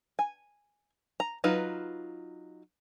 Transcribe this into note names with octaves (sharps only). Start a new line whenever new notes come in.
G#5
A#5
F#3 D#4 F4 B4